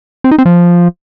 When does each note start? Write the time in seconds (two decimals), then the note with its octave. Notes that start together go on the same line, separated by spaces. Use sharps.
0.24 C4
0.31 D#4
0.38 C4
0.46 F3